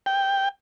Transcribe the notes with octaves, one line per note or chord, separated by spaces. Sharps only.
G5